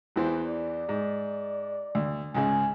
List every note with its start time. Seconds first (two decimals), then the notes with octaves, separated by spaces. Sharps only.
0.16 E2 E3 C5
0.46 D5
0.89 G#2
1.95 D2
2.35 C#2 G#2 C#3 G#5